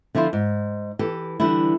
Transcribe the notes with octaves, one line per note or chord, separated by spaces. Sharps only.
D3 F3 E4 F4 C5
G#2
E3 G4 A4
D3 E3 G3 D4 E4